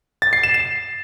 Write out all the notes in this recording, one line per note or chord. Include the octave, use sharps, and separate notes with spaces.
A6
C7
E7
E7